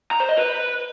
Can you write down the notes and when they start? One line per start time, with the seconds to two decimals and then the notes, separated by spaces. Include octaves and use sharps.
0.11 A#5
0.20 C5
0.29 D#5
0.38 B4